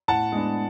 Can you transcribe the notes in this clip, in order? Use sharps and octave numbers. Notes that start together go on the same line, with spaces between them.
A2 F#5 A5
G#3 B3 D4